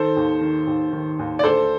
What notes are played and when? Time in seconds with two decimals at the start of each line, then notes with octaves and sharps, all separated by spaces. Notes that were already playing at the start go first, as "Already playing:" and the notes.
Already playing: D#3 A4 C5
0.16 D#2
0.41 D#3
0.67 D#2
0.92 D#3
1.19 D#2
1.39 D5
1.44 D2 A4 C5